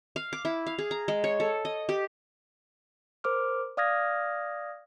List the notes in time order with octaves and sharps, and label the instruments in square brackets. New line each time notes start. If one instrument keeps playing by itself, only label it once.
[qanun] F5
D6
E4
F5
G#4
A#5
G#3
C#5
A4
D#5
G4
[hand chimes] A#4 C5 D6 F6
D5 F5 D#6 F6 G#6 A#6